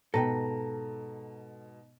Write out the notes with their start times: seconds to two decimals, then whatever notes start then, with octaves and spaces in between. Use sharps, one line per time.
0.14 G#2 B2 A4 B4 G5 A5 A#5 A#6